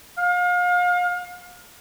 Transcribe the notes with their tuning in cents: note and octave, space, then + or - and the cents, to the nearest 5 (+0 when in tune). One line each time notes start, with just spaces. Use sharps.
F5 +35